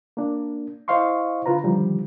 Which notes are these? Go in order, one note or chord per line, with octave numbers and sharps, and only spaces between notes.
A#3 D4
E4 C5 D#5 F5 C6 C#6
D3 F4 B4 A#5
D3 D#3 F3 G3